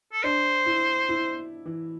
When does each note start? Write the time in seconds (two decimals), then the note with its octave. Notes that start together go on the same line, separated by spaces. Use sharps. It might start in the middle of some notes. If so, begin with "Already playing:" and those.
0.12 A4
0.23 D4 C5
0.66 E4
1.09 E4
1.66 E3